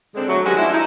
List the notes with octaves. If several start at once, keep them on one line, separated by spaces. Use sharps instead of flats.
D3 G#3 C4
F#3 A3
D#3 G#3 C#4 F#4 G4 B4
F3 G#3 D4 E4
D#4 E4